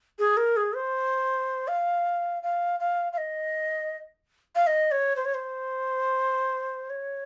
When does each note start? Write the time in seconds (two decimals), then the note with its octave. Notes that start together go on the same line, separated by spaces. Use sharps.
0.19 G#4
0.37 A#4
0.57 G#4
0.75 C5
1.68 F5
2.43 F5
2.80 F5
3.13 F5
3.18 D#5
4.55 F5
4.67 D#5
4.91 C#5
5.16 C5
5.25 C#5
5.34 C5
6.90 C#5